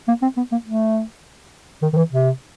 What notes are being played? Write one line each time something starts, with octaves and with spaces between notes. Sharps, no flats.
A#3
C4
B3
A#3
A3
D#3
D#3
E3
C3